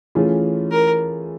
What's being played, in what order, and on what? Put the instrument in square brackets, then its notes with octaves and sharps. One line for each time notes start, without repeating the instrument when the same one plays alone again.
[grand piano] E3 A3 C#4 F4 G#4
[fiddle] A#4